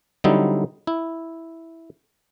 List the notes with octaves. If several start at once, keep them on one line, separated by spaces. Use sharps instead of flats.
D3 F#3 G3 C4 D#4 E4
E4